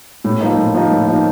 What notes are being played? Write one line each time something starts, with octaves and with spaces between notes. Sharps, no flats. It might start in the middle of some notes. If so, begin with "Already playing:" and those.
A2
F3 A#3 D#4
A2
F3 A#3 D#4
A2
F3 A#3 D#4